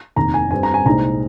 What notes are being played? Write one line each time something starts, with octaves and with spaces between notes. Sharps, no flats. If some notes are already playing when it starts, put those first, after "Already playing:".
F1 D#2 D#3 A#5
G#5
G2 G3 C4 G#5
A#5
G#5
C2 A#2 G#3 C4 D#4 A#5